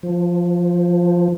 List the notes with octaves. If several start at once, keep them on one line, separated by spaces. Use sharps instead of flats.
F3